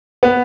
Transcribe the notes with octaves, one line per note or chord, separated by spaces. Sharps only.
B3